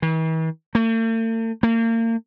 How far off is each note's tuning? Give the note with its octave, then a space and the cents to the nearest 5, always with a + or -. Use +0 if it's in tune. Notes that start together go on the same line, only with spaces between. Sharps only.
E3 -45
A3 +45
A#3 -35